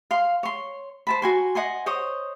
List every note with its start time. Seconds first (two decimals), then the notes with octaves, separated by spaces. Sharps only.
0.11 F5 C6
0.43 C#5 C6
1.07 C5 A5 B5
1.22 F#4 G#5 C6
1.55 D#5 F#5 G#5 C6
1.86 C5 C#5 D#5 D#6